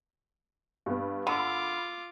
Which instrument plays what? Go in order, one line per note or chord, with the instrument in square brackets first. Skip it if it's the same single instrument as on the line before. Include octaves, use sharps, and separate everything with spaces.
[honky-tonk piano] G2 B3
[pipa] D3 [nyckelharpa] F4 D6 [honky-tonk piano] B5 E6